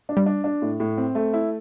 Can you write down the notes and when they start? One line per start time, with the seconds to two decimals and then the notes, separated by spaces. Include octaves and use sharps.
0.09 D4
0.17 G3
0.26 D4
0.44 D4
0.62 A2
0.80 A2
0.98 C4
1.15 A3
1.33 E4